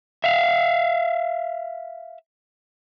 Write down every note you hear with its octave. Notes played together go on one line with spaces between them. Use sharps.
E5 F5